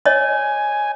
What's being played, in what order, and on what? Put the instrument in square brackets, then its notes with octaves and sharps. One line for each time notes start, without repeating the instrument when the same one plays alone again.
[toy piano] C#5 D#5 [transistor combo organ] G#5